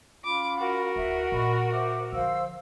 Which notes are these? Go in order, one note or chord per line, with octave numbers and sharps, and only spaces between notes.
C#4 F4 B5 D6
F#4 A#4
D2 E4 E5
A#2 D#5 B5 C#6
C5 E5 D6
D3 F3 C5 F5 E6